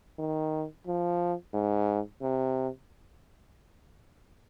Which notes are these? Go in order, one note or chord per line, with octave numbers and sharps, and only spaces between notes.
D#3
F3
G#2
C3